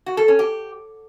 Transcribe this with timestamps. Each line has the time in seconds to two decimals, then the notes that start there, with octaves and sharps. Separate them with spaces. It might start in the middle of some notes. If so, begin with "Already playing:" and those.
0.06 F#4
0.17 A4
0.28 C#4
0.39 G4